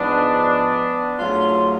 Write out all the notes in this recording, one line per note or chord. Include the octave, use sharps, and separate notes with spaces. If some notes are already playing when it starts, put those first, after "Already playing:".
Already playing: G#2 F3 G#3 B3 D4
G#2 F#3 A3 C#4 F4